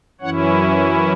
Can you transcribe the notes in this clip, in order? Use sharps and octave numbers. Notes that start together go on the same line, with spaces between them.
F#2 E3 C#4 E4 C#5 F#5